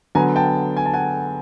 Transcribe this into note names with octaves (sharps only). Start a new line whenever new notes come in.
D3 F#3 B3 G#5 A#5
G5 A5
G#5
A5
F#5 G#5